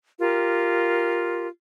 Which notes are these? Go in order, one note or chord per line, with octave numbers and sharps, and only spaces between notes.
F4 G4 A#4